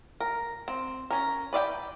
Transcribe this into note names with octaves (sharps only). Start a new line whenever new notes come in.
A#4
C4
C#4 A#4
B4 D5 E5 G5